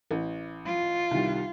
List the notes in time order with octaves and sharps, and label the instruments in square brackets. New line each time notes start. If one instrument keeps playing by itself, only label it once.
[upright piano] A1
[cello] F4
[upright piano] C2 D#3 G3